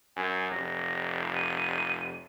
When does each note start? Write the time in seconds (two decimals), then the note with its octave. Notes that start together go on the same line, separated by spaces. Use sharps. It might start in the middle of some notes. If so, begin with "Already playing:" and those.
0.16 F#2 G#5
0.51 F1 A#6
1.35 D#7